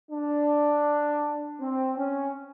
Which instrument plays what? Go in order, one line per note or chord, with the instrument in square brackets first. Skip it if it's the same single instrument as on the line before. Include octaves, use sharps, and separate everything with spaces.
[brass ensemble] D4
C4
C#4